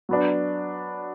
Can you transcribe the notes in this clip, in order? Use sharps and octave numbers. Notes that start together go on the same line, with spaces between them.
F#3 B3 D4